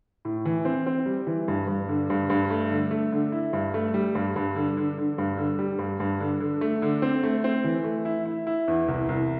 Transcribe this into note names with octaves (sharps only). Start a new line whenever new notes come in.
A2
E3
C4
C4
G3
E3
G2
G2
D3
G2
G2
A3
D3
A3
D3
E4
G2
A3
G3
G2
G2
D3
D3
D3
G2
D3
G3
G2
G2
D3
D3
A3
D3
C4
A3
C4
E3
A3
E4
E4
E4
E2
C2
C2